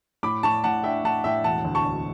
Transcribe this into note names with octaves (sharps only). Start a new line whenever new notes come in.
A2 B5 D6
A2 A5 C#6
A2 F#5 A5
D4 E5 G5
A2 F#5 A5
A2 E5 G5
E1 F#5 A5
D2
A5 C#6
D2